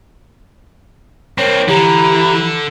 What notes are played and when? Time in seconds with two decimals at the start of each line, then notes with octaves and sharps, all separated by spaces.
1.38 C4 D4 A#4 C#5
1.68 D3 E3 G4 A#5